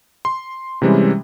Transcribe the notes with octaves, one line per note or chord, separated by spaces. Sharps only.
C6
C3 E3 G3 G#3 C#4